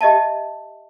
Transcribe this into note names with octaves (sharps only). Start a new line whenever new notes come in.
G4 D#5 E5 A5